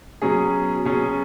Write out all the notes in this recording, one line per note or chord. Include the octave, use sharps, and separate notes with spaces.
B2 F#3 C#4 G#4
B2 F#3 C#4 G#4